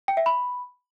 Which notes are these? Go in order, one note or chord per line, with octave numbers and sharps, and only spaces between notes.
G5
E5
B5